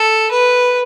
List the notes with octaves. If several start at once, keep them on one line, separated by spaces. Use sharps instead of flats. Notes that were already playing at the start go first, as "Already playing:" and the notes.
Already playing: A4
B4